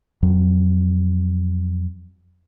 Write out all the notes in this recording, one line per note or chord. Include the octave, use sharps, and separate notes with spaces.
F2 F#3